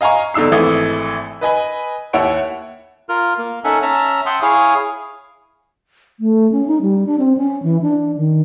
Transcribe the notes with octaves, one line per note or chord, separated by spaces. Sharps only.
D#5 F5 G#5 A#5 C#6
E2 D3 D#4 E6 C7
G#1 E3 A3 D#6
B4 D#5 G#5 B5
D#2 E4 C#5 F#5 D7
F4 A#4 F6
A#3
C#4 D#4 A4 E5 F#5 G#5
C#4 E5 A5 A#5
E5 F#5 G5 A5 C6 D#6
E4 G#4 C#5 F5 G#5 D#6
A3
C#4
D#4
G3
D4
C4
C#4
E3
D4
D#3